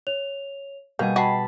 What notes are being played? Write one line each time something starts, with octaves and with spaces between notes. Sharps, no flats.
C#5 F7
B2 G3 A#3 G#4 D#5 G6
F#4 D#5 G5 A5 B5 C7